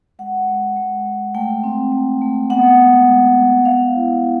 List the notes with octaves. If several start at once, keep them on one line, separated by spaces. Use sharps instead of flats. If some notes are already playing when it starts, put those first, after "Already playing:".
G#3 F#5
G#3
G#3
G#3
A3 G5
C4
A3
A3
B3 F#5
G#3
G#3
G#3
B3 F5
E4
E4